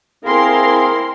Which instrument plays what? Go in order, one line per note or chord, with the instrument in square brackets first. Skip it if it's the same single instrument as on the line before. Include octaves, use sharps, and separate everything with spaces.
[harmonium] C4 G#4 F5 [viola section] E4 A#4 C6